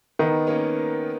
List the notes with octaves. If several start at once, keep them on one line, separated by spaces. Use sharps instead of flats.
D#3 B3 D#4
A#3 C#4